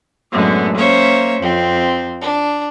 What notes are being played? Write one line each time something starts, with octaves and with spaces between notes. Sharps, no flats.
F#2 A2 D3 G#3 B3
A#3 C#4 C5 C#5 E5
F2 C4
D4